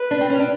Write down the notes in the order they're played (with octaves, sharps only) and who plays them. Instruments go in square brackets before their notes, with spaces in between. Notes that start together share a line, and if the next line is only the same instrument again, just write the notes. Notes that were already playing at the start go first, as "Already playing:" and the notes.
Already playing: [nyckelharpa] B4
[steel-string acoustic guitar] D4
C4
C#4
D4